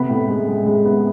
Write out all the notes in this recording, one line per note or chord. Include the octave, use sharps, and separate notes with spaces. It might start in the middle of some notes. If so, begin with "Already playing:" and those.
Already playing: C3 B3 B5
A2
G#3
G#3
G#3
B3